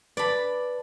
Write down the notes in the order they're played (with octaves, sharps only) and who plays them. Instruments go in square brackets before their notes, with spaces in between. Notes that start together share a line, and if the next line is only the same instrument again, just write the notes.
[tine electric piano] B4 A5 [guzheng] D5 B5